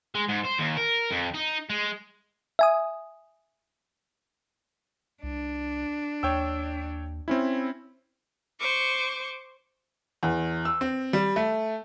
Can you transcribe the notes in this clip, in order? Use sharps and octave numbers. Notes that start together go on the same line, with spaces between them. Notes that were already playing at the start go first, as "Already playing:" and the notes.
G#3
G#2
C5
D#2
A#4
F2
D#4
G#3
E5 G#5 D#6
C2 D4
D#2 C#5 G5 E6
C4 C#4 E4
C5 C#6 D6
E2
E6
C4
G3
A3